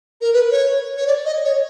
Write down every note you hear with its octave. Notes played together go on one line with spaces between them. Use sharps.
A#4
B4
C#5
C#5
D5
D#5
C#5